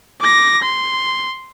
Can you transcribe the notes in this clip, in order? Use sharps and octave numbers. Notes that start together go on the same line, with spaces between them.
D6 A#6
C6